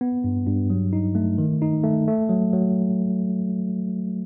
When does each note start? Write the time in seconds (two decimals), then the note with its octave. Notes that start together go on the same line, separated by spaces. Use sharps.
0.01 B3
0.24 G2
0.47 G2
0.70 F#3
0.93 D#4
1.15 A3
1.38 D#3
1.62 D#4
1.84 A3
2.08 A3
2.29 F#3
2.53 F#3